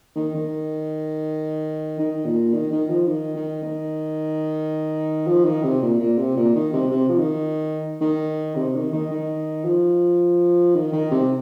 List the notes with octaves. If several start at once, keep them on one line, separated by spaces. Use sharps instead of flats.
D#3
D#3
D#3
A#2
D#3
D#3
F3
D#3
D#3
D#3
F3
D#3
C3
A#2
A#2
C3
A#2
D#3
C3
C3
F3
D#3
D#3
C3
D#3
D#3
D#3
F3
D#3
D#3
C3